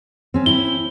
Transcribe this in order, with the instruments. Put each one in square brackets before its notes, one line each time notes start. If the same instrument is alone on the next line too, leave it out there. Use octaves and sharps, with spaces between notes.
[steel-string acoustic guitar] C4 C#4
[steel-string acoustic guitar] C4 E4 [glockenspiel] G7